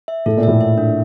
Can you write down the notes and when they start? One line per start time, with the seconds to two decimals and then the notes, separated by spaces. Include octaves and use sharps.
0.08 E5
0.26 A2 A4
0.37 A#2
0.43 A2 E5
0.61 E5
0.78 D4